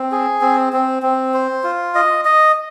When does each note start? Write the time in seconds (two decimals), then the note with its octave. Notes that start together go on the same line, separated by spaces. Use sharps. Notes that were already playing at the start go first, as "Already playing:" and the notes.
Already playing: C4
0.12 G#4
0.41 C4
0.73 C4
1.03 C4
1.34 C5
1.64 F4
1.95 D#5
2.25 D#5